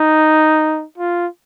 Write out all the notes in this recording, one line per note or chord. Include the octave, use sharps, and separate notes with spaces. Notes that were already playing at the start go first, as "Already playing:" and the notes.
Already playing: D#4
F4